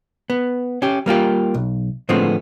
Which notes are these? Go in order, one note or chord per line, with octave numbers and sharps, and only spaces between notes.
B3
C#4 G4
G3 A#3 F4 G4
B1
A2 D3 F3 G#3 B3 C4